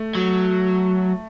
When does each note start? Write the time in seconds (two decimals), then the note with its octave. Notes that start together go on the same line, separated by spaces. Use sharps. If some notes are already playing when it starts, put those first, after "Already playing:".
Already playing: A3
0.15 F#3